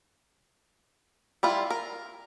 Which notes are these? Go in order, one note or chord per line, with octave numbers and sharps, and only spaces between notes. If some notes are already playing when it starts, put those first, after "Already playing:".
G3 E4 F4
A#4